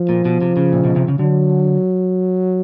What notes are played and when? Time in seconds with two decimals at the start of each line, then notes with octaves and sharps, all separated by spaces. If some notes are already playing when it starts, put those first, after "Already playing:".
Already playing: F3
0.09 A#2
0.25 B2
0.41 C3
0.57 C#3
0.73 A#2
0.85 B2
0.96 C3
1.08 C#3
1.19 D3 F#3